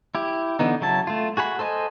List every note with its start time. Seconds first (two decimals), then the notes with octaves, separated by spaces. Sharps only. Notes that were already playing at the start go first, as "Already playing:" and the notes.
0.15 E4 G4
0.59 D3 E3 B3 D#4
0.81 C#3 F#3 E4 A5
1.07 A3 F4
1.37 F#4 G#4 F#5 B5
1.59 A4 C5 D#5 G#5